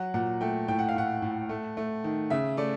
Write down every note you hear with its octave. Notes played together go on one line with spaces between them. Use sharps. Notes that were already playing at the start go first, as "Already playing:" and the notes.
Already playing: F#3 F#5
A#2 F#5
A3 G5
A2 G5
F#5
F5
A2 F#5
A2
A3
A3
D#3
C#3 E5
A3 D5